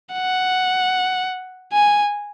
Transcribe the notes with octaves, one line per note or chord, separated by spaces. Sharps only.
F#5
G#5